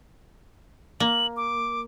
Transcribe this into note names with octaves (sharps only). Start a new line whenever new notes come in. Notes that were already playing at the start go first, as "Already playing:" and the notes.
A#3 F#7
D6